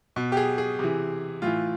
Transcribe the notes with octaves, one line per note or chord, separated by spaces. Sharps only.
B2
G4
G#4
G#4
C3 E3
A2 E3 F4